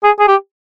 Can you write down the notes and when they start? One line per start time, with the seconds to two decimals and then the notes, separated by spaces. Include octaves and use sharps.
0.03 G#4
0.19 G#4
0.28 G4